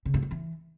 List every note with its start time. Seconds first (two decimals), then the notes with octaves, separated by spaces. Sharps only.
0.06 C#3
0.14 G2
0.22 F#3
0.31 E3